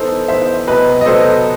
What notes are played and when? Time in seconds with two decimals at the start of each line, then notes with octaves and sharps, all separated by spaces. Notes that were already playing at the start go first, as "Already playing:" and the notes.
Already playing: E3 B3 D#4 A4 C5
0.28 E3 B3 D#4 C5 E5
0.67 C3 F#3 B3 B4 D#5
1.01 D#5
1.06 C3 F#3 B3 A4 C5